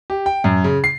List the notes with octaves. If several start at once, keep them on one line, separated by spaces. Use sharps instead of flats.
G4
G5
F#2
C#3
C7